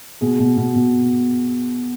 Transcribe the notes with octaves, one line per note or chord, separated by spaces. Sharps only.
B2 G#4
B2
B2
B2